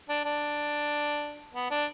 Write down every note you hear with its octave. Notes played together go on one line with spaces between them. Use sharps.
D4
D4
B3
D4